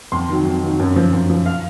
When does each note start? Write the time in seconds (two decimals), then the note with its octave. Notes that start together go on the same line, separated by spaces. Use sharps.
0.12 F2 C6
0.29 D#3 F#3
0.45 F2
0.62 D#3 F#3
0.79 F#2
0.96 F3
1.13 F#2
1.30 F3
1.46 F5